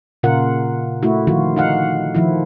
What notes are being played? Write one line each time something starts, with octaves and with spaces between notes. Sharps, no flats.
A#2 C#3 F4 A#4 F#5
A3 E4 F#4
D3 D#3 F3 F4 F#4
D#4 F5 F#5
D#3 F3 E4